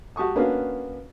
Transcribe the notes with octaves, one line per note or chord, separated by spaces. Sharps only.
F#4 G4 A5 C#6 D#6
A#3 B3 C#4 D4 F#4 F5